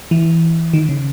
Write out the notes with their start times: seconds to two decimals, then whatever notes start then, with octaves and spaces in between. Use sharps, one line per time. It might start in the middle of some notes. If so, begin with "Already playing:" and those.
0.11 E3
0.73 D#3
0.89 C#3